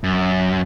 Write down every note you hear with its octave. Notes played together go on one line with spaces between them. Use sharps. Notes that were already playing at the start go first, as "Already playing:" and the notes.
F#2